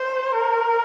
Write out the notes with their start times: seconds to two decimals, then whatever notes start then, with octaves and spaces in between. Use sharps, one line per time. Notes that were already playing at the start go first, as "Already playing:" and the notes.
Already playing: C5
0.34 A#4